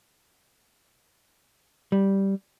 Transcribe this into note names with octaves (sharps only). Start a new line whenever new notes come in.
G3